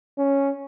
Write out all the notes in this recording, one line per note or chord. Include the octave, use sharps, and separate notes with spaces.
C#4